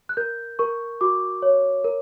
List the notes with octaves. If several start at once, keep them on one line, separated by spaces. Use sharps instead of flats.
F#6
A#4 G6
A#4 C#6
F#4 D6
C#5
A#4